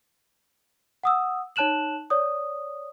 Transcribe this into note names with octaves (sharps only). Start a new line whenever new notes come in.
F#5 D#6 E6
D#4 C#5 A5 F#6 E7 F#7
C#5 D5 D#6